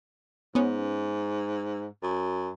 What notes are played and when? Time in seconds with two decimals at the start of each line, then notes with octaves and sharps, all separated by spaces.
0.55 G#2 B3 C#4
2.03 F#2